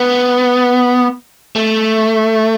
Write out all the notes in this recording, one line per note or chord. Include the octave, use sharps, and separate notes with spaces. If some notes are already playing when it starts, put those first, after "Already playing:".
Already playing: B3
A3